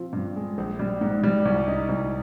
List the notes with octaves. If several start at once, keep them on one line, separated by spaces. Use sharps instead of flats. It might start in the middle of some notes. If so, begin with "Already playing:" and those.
Already playing: F3 C4
G2
G#3
A#1
G3
G#2
G3
C2
D#4
C2